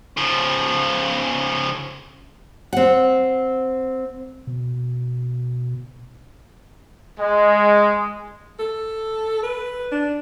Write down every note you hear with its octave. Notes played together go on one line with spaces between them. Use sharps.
C#3 F3
C4 F#5
B2
G#3
A4
B4
D4